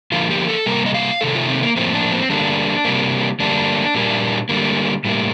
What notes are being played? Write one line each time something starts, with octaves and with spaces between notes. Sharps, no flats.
D3 F3 A#3 F4
G4
A4
C3 G3 A#3 A#4
D#5
F5
C3 D#3 A3 A4
F4
C4
A#3
A2 F3 A#3 C4
D4
C4
D3 G3 A#3 D4
C3 G3 A#3
D3 G3 A#3 D4
A#2 G3 A#3
D3 G3 A#3
A2 G3 A#3